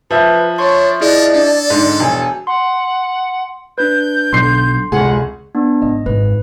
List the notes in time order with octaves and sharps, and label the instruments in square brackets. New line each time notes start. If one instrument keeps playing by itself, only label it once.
[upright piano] F3 E5 [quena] B4
[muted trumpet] D4 [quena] C#5 [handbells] C6 C#6 G#6
[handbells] E4 G#4 D#5 [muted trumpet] F4 [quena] D5
[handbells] D4 [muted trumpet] A4
[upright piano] G#2 D3
[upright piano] E1 [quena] G#5
[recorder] F#5 [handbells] C6
[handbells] D4 B4 [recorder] G6
[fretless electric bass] B1 [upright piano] D3 C7 [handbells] C6
[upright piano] F1 G#4 [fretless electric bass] C#2 [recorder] F#5
[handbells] B3 D4
[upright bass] G#1 [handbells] D#5
[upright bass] G#1 F#2 [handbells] B4